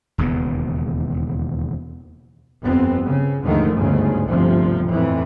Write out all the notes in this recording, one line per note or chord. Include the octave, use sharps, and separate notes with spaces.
E1 D#2 C#3 B3
G1 F2 B3 C4
C#3
D#2 G#2 D3 D#3 F3 A3
G1 D2 G#2 C#3
G1 D2 C3 F3
F2 A2 E3